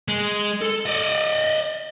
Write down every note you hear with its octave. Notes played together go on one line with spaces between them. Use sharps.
G#3
A4
D5 D#5